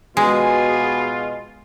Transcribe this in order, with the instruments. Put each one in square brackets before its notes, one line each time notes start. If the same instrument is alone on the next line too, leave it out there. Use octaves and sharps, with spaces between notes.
[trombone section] B2 [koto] G#3 [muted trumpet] F4 [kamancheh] G#4